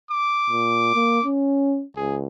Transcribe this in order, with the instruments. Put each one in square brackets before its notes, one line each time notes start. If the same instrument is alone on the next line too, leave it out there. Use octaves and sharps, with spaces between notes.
[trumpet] D6
[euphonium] A#2
A#3
C#4
[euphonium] C#2 [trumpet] G#4